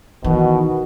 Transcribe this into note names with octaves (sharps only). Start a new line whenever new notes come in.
B2 D#3 E3 F#4